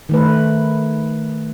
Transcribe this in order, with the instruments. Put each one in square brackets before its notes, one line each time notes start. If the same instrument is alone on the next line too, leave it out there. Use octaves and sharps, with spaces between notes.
[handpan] D#3 A3 B4